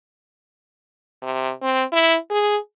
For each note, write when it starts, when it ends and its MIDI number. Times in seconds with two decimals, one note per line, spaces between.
1.22 1.52 48
1.62 1.84 60
1.92 2.17 64
2.30 2.57 68